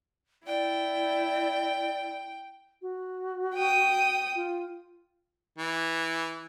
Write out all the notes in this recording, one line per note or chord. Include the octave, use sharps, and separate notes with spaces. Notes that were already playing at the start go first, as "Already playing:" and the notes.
E4 D5 G5
F#4
G5 D#6
F4
E3